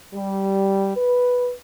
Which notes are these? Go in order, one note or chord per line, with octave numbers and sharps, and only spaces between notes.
G3
B4